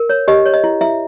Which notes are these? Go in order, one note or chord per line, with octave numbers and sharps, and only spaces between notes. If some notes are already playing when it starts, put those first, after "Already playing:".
Already playing: A#4
C#5
G4 D#5
C#5
D#5
E4
E4 E5